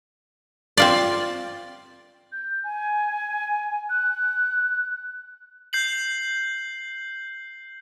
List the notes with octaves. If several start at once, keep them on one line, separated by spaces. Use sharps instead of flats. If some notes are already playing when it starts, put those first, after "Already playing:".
C4 F4 D5
G6
G#5
F#6
G6 C7 F#7